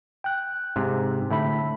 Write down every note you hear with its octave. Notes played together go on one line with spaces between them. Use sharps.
G5 F#6
G#2 C3
A2 D3 E5 B5